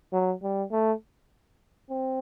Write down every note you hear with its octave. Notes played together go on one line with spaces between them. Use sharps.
F#3
G3
A3
C4